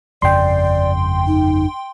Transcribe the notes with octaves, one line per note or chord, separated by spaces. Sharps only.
G1 F2 C#3 D5 G5 C6
D#4